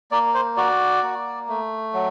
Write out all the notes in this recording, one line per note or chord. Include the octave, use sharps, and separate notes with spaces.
A#3 D5
C5
F#4 D5
A#3
A3
F#3